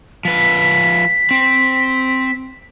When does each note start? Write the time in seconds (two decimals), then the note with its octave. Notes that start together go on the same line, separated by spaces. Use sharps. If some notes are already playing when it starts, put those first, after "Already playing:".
0.25 F3 B4 B6
1.31 C4